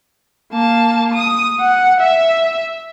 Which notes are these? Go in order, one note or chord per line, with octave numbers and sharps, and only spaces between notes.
A#3 A5
D#6
F#5
E5